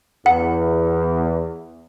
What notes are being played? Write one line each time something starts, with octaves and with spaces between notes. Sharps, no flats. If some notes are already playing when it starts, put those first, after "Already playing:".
E2 F#5